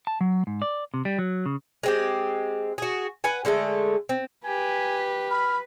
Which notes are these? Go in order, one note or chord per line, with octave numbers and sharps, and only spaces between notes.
A5
F#3
G#2
D5
C3
G3
F#3
C#3
G#3 C4 G4
F#4 G#4
B4 F#5 G#5
D3 G#3 A3 A4
C4
G4 B4 G#5
B5 F6